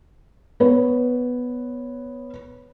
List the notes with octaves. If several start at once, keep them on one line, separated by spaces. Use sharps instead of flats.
B3 B4 C#5